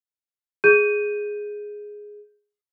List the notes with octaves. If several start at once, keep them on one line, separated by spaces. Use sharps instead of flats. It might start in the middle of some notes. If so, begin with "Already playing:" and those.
G#4 G6 D#7